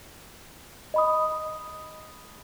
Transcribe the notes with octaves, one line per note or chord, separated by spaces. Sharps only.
D#5 B5 D#6